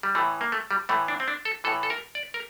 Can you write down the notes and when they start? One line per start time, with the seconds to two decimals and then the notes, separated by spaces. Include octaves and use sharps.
0.03 G3
0.15 A2 E3 A3
0.41 A#3
0.52 A3
0.71 G3
0.89 A2 E3 A3
1.08 D4
1.20 C4
1.28 D4
1.45 A4
1.64 A2 E3 A4
1.83 A4
1.90 A#4
2.15 D5
2.34 A#4